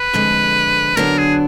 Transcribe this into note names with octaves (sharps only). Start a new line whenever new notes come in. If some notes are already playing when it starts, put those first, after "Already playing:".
Already playing: B4
F2 D3 G#3
D3 F#3 B3 D4 A#4
G#4